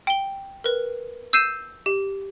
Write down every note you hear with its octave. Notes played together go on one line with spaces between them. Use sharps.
G5 G7
A#4 B4
E6 G6 C7 D#7 E7
G4